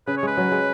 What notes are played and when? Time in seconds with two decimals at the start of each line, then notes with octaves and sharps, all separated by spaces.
0.07 C#3 B4
0.17 C#5
0.23 G#3 B4
0.37 F#3
0.52 G#3